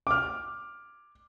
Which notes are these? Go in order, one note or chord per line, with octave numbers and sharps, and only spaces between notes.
D6 F6